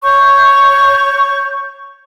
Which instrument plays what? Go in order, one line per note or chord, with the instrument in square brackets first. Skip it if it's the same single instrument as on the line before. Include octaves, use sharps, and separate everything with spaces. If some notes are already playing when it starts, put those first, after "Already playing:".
[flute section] C#5 C#6 G6